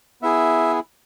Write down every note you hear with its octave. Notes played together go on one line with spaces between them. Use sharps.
B3 E4 G#4 E5